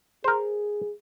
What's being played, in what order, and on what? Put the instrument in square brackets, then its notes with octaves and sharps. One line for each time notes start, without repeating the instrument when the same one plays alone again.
[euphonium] G#4 [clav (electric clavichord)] A#4 C5